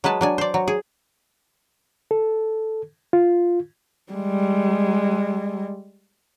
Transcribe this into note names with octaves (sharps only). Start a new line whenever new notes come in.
F#3 G#3 B4 A5
F#3 D4 G#5
C5 D5
F#3
G#4
A4
F4
G3 G#3